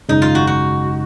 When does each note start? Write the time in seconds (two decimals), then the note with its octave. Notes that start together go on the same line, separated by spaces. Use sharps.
0.09 G#1 F#2 C#3 G#3 D#4
0.22 F4
0.35 F#4
0.47 F#4